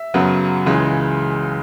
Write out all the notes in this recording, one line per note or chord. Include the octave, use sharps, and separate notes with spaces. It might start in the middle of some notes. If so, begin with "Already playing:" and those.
Already playing: E5
F#2 C#3 F#3 B3
C#2 C#3 E3 G#3